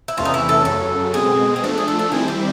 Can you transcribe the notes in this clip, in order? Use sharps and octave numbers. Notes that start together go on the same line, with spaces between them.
E4
E2 C3 E3 A3 C#4 F4
D#4
E4
A4
F#2 C#3 F#3 A4
B2 G#3 C4 G#4
G#4
F3 A3 D4 A4
G#4
A4
A4
D#3 G3 C4 E4 G#4
G4